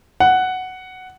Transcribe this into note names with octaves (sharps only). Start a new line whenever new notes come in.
F#5